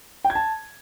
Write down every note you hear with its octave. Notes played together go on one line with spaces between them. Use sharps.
G5
G#6
A5